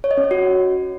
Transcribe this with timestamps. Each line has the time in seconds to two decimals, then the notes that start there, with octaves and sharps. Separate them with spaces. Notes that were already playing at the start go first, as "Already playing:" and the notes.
0.04 C#5
0.11 D#5
0.17 C#4
0.24 C#5
0.31 F#4